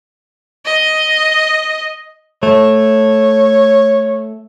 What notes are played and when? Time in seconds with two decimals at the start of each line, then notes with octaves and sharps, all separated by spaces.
0.66 D#5
2.43 A3 C#5